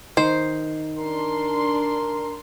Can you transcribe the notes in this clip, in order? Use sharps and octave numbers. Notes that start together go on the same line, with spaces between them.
D#3 C5
D4 A#4 C6